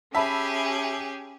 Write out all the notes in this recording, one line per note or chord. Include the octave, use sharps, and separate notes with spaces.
C#4 G4 G#4 E5 A5 B5